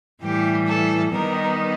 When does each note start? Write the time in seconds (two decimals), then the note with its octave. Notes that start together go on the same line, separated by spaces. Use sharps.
0.22 A2 E3 G3 G4
0.68 A4
1.13 D#3 G3 B3 D#4 A#4